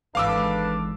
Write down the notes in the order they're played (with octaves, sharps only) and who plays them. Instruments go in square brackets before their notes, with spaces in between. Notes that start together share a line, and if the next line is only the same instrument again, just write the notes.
[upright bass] G#1 E3 [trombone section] D4 A4 B4 [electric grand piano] F5 D6 E6